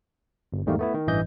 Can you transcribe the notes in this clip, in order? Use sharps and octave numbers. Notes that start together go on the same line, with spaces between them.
G1
E2 G#2 D#3 G3 A3 A#3
A3 B3 E4
D#3
A1 G2 E3 D#5 G6